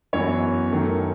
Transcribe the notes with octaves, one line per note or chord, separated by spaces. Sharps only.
F#2 E3 B3 C#5
F#2 D#3 A3